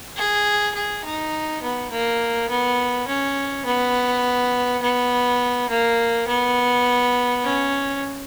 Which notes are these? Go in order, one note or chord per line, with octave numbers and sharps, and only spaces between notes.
G#4
G#4
D#4
B3
A#3
B3
C#4
B3
B3
A#3
B3
C#4